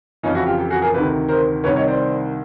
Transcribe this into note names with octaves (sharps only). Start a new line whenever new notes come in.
F2 C#3 E3 C#4 D#4
E4 F#4
F4 G4
G4 A4
F#4 G#4
G#4 A#4
D2 C3 D#3 A4 B4
A#4 C5
C2 C3 D#3 B4 C#5
C#5 D#5
C5 D5